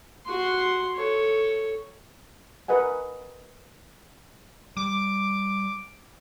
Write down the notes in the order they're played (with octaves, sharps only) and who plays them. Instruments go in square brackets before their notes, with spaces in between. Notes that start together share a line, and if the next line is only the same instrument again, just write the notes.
[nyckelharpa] F#4 C6
A4 C#5
[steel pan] A#4 B4 D#5 F#5 G#5
[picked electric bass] G3 [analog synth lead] D6